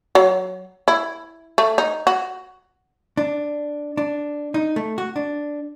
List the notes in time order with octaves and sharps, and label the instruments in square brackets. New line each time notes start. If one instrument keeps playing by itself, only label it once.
[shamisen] F#3
E4
A3
D#4
F#4
[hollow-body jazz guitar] D4
D4
D#4
A3
F#4
D4